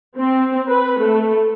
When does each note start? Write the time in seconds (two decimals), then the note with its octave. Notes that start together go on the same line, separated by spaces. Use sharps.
0.17 C4
0.67 B4
1.00 A3